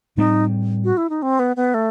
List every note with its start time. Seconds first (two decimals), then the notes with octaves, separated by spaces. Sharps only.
0.17 A2 G3 C4 D#4
0.84 F#4
0.97 E4
1.10 D#4
1.22 C4
1.39 B3
1.56 B3
1.74 A3